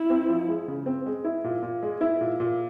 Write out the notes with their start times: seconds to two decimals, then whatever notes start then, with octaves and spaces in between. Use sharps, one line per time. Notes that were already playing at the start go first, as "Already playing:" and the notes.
Already playing: E4
0.10 C4
0.29 F3
0.49 G#3
0.68 C#3
0.86 C4
1.06 G#3
1.24 E4
1.44 A#2
1.63 A#2
1.83 G#3
2.01 E4
2.21 A#2
2.40 A#2